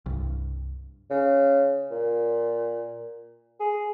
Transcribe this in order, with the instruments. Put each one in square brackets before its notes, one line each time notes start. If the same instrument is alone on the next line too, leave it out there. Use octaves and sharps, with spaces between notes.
[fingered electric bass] C2 G2
[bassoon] C#3
A#2
G#4